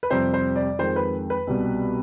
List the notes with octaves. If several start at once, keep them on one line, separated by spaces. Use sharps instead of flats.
B4
F2 C3 G3 C5
C5
D5
F2 D#3 G#3 C5
B4
B4
C2 B2 G3